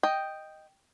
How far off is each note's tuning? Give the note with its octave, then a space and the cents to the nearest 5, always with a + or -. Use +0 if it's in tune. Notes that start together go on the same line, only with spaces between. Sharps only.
D#5 +0 G5 +0